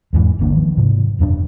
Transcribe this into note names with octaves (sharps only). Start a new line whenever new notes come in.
E2 G#2 E3
G1 D2 A#3 D4
D#3 F3
G#2 C3
E1 F#2 C#4 D4